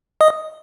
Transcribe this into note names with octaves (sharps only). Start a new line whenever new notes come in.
D#5 D#6